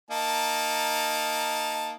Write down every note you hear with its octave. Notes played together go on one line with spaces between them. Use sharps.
A#3 D#4 A5